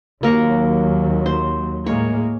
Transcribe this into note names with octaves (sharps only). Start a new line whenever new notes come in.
D#2 F#3 A#3 A#4 C#6
C5
A2 G#3 A#3 C#5